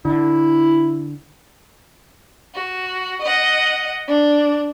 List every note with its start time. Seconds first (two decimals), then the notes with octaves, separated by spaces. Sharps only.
0.05 D3 E4
2.54 F#4
3.22 D#5 F#5
4.07 D4